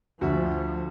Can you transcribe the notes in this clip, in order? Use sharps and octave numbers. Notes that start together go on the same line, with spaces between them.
D2 F3 F#4 E5